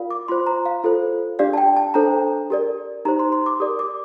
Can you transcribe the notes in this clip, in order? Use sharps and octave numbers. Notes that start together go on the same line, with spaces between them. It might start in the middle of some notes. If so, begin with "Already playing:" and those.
Already playing: F4 A#4 D5 F5
D6
F4 C5 C6
A#5
F5
F4 A4 C5
D4 G4 D5 F5
A5
G5
A5
D4 A4 C5 A#5
G4 A#4 D5
D#4 G4 C5 A#5
C6
C6
D6
G4 A#4 D5 D#6
D6